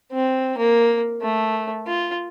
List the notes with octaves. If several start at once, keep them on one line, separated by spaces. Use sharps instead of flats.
C4
A#3
A3
F4